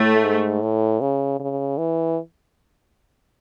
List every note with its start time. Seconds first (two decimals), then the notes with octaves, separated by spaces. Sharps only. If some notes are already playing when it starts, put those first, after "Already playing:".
Already playing: A2 A3
0.24 G#2
0.63 A2
1.01 C#3
1.40 C#3
1.78 E3